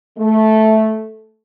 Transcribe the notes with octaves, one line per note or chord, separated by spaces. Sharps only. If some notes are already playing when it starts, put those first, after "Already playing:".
A3